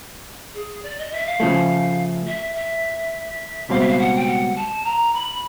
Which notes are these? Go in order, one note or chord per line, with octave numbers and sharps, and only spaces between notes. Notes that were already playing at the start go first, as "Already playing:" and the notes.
G#4
D5
D#5
E5
F5
C#3 F3 A3
E5
E5
C#2 B2 G3 C4 F5
E5
F5
F#5
G5
F#5
A5
A#5
B5